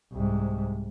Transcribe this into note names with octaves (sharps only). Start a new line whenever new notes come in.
C2 G#2